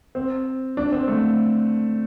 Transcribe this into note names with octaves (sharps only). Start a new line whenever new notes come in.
C4
D4
C4
A3